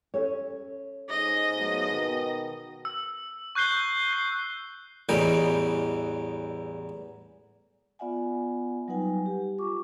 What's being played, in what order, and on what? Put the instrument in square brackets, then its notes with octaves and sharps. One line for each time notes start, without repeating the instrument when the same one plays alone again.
[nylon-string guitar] C#4 A4 C#5
[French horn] G#2 [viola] D#5
[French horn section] F#3 A3 B3
B2 D#3
[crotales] E6
C#6 F#6 G6 C7 G7
C7
[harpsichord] A1 E2 E3 G3 D#4 D#5
[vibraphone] B3 F4 D5 E5 F#5 G#5
F#3 G3 D#4 B4 F#5 G#5
G4
F4 C#6 D6